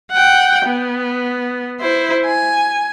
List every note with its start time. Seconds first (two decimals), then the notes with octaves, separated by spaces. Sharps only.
0.12 F#5 G5
0.66 B3
1.80 E4 C5
2.26 G#5